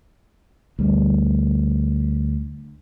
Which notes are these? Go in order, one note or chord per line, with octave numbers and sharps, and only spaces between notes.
D2 G3